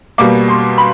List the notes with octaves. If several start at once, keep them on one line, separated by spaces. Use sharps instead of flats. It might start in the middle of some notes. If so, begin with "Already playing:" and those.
B2 G3 A#3 D6
C6
B5